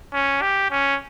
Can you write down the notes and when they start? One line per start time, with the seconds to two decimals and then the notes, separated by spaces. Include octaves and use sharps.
0.13 C#4
0.42 G4
0.71 C#4